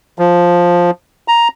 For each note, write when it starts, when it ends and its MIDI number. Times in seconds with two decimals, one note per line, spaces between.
0.19 0.91 53
1.28 1.48 82